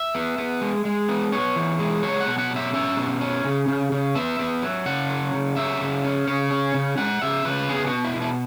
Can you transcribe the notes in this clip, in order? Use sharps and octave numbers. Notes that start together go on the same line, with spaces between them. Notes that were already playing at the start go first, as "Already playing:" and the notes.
Already playing: E5
B3
B3
G#3
G#3
B3
B3 C#5
E3
G#3
F#3 C#5
F#5
B2
F#5
F#3
E5
C#4 E5
B2
C#4
C#3
C#3
C#3
B3 E5
B3
F#3
C#3 F#5
F#3
C#3
F#3 E5
C#3
C#4
C#3 C#5
C#4
C#3
G#3 F#5
C#3 E5
C#3 B4
B3 G#4
F#4
B2
E4
B2
E4